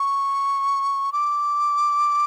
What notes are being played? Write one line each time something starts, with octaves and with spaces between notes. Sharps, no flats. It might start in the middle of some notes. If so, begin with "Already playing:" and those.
Already playing: C#6
D6